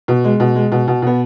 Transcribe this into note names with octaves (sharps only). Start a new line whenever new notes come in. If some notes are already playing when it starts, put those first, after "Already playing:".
B2
G#3
B2
G#3
B2
B2
B2 B3